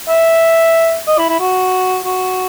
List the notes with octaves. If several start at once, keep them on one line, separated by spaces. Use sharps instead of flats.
E5
D#5
E4
E4
F#4
F#4